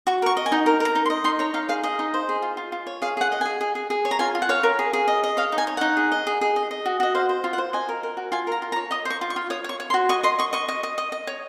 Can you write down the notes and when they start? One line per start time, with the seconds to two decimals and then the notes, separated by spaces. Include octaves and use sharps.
0.07 F#4 C#6
0.22 A#4 C#6
0.37 D#5
0.46 G#5
0.52 D#4
0.66 A#4
0.80 A#4 A#5
0.95 D#4
1.06 C6
1.10 D#5
1.24 D#4 C6
1.39 C#5 A#5
1.54 D#4 F5
1.69 G#4 F5
1.83 G#4 D#5
1.99 D#4
2.14 C5
2.29 G#4
2.42 F4
2.57 F4
2.72 F4
2.87 C#5
3.02 G#4 F5
3.17 G#4 F#5
3.32 D#5 F#5
3.41 G#4 G#5
3.61 G#4
3.75 G#4
3.90 G#4
4.05 C#5
4.11 A#5
4.19 F4 G#5
4.35 F4
4.42 F#5
4.49 C#5 F5
4.63 A#4
4.79 G#4
4.93 G#4
5.08 D#5
5.23 D#5
5.37 C#5 F5
5.52 D#4
5.58 G#5
5.67 C#5
5.77 D#4 F#5
5.97 G#4
6.12 D#5
6.27 G#4
6.41 G#4
6.56 D#5
6.71 D#5
6.86 F#4
7.00 F#4 D#5
7.15 C5 F5
7.29 C5
7.44 F4
7.53 F#5
7.58 C5
7.73 D#5 G#5
7.89 A#4
8.03 A#4
8.17 F#4
8.32 F4 G#5
8.47 A#4 A#5
8.62 F4
8.72 A#5
8.76 C#5
8.91 D#5 D#6
9.05 C5
9.10 C#6
9.21 F4
9.30 C#6
9.36 F4
9.50 C#5 D#6
9.64 C#5 C#6
9.80 C#5
9.90 C6
9.94 F#4
10.09 D#5 C#6
10.23 D#5 C6
10.39 D#5 C#6
10.53 D#5 C#6
10.68 D#5
10.83 D#5
10.98 D#5
11.12 D#5
11.27 C#5